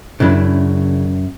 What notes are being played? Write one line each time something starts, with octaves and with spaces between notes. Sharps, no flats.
F#2 C#3 D4 E4